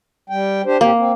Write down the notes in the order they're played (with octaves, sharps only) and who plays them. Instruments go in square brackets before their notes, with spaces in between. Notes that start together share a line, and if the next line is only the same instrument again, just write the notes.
[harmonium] G3 G5
D4 G4 C5
[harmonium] A2 C4 G4 [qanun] A#3
[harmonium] C4